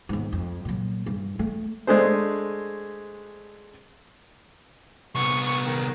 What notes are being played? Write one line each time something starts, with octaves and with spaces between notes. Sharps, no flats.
D#2 G#2
F2
A#2 F#3
G2
A3
G#3 A3 D4 G#4 C5
C2 B3 C#6
D#3